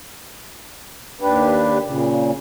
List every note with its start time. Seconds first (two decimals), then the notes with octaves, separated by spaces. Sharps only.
1.21 D#2 D4 G4 B4
1.86 A#2 C#3